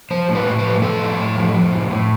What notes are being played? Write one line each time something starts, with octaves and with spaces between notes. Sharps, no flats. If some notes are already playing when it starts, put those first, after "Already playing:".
F3 C5
A2
B4
A2
B4
F3
F3 A4
A2
A2
F3
F3
A2
A2